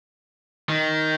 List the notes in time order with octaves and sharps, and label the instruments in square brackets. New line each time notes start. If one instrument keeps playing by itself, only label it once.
[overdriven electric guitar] D#3